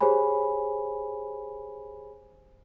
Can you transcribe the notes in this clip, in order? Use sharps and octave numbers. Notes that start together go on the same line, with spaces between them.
G4 G#4 C5 C#5 G#5 B5